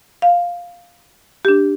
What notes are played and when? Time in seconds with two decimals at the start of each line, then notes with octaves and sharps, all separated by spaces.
0.22 F5
1.45 D4 G4